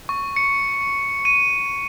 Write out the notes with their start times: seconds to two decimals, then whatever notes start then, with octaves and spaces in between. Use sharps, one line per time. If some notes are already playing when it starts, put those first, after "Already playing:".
0.09 C#6
0.36 C#7
1.25 D#7